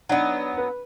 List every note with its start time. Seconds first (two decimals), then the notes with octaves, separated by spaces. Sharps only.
0.09 F#3 B3 D4 D#4
0.57 B4